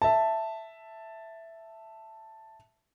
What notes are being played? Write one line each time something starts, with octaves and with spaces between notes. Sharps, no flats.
E5 A5